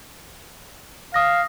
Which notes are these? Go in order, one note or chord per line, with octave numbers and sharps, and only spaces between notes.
F5 D#6 A#6